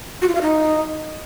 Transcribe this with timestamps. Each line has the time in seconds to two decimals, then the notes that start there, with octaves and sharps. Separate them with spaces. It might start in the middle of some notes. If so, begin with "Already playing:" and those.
0.22 F#4
0.28 F4
0.35 F5
0.42 D#4